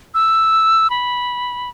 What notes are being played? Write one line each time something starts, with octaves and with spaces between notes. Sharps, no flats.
E6
B5